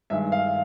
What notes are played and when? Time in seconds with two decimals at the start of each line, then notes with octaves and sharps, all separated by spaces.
0.10 G2 D#3 G#3 E5
0.32 F5